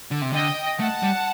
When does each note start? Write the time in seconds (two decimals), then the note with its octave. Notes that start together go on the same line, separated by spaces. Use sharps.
0.11 D3
0.22 C3
0.33 D3 D#5 G5
0.79 A3 F#5 A5
1.03 G3